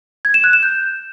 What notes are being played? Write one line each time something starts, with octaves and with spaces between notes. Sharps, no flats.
G#6
E7
F#6
E7
G6